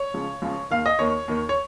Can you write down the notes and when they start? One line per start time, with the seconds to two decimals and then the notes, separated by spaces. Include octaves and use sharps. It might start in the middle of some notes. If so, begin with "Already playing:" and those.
Already playing: C#5
0.14 C#2 C#3 F3
0.42 C#2 C#3 F3
0.71 D#2 D#3 F5
0.86 D#5
0.99 D#2 D#3 C#5
1.28 D#2 D#3
1.49 C#5